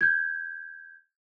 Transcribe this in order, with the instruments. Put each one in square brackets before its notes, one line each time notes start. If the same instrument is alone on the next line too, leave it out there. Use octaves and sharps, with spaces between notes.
[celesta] G6 G#6